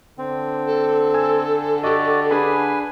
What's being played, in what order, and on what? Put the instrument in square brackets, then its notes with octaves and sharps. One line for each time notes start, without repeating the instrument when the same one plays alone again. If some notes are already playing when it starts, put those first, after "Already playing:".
[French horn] D3 [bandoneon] C4
[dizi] A4
[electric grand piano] G#5 E6 G#6
[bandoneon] F#4 D5 [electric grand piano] G4 D#5
[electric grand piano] D4 G#4 B5 [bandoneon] B4 G#5